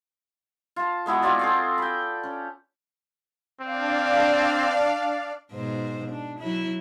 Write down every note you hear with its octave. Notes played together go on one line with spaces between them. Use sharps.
F4 A5
G#3 B3 E4 F#4
C4 F4 F#4 D5
C4 G#4 A4
G5 B5
C#4
C4 D4 D5 F5
G#2 B2 C5
D4
F#3 E4